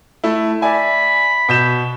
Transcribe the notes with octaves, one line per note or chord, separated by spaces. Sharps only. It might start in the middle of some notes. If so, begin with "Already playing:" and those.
A3 E4
D5 E5 G#5 B5
B2 G6 E7